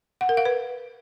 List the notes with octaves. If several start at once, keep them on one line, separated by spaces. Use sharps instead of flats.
F#5
A#4
F5
B4